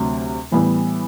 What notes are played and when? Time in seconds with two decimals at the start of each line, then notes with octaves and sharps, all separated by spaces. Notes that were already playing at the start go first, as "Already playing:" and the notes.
Already playing: D2 C3 F#3
0.51 A2 E3 G3 B3